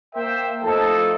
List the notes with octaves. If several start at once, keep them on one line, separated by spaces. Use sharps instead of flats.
A#3 A#4 C5 E5 G5
F3 A3 D#4 E4 A4